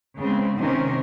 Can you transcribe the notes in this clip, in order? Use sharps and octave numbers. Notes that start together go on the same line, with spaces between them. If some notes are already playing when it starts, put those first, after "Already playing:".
C#3 G#3 B3 C4
C3 D#3 E3 C#4 A#4